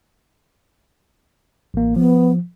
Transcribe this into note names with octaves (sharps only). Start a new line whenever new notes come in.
A1 A#3
F3 B3